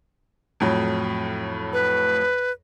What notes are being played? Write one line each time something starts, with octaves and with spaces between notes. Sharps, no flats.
F2 A2 F#3
B4